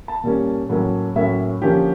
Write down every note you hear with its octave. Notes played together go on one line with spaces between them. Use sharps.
A5
A#2 G3 A#3 C#4
A2 F#3 A#3 C#4
A2 F#3 A#3 C#4 E5
D3 F3 A#3 C#4 G4